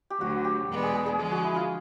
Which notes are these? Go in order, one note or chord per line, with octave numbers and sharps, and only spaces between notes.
G4
D2 D3 F#3 F#4
G4
E2 B2 G#3 B3 D4
G#4
G#4
G#4
D3 F3 G#3 G#4
F#4
E4
F4